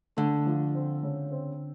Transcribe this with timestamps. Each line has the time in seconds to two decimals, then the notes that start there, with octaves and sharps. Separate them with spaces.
0.17 D3 A3
0.46 F3
0.75 C4
1.03 C#3
1.32 C4